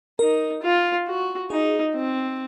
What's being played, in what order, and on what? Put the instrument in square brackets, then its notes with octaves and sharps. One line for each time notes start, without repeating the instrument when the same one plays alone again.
[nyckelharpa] D#4 [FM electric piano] A#4
[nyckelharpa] F4
F#4
[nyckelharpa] D#4 [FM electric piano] G#4
[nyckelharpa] C4